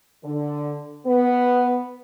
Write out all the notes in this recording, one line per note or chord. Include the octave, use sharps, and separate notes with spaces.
D3
B3